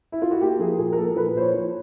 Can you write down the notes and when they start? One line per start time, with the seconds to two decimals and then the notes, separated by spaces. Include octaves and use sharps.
0.12 E4
0.22 F4
0.31 F#4
0.41 A#3 G4
0.59 F3 G#4
0.78 A#2 G#4
0.92 A#4
0.97 A#2 A4
1.16 F3 B4
1.35 A#2 C5
1.41 C#5
1.54 F3